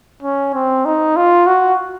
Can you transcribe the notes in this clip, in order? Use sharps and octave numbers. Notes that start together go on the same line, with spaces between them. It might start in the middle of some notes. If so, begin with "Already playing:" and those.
C#4
C4
D#4
F4
F#4